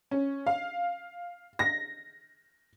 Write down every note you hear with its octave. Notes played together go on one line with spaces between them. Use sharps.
C#4
F5
A#6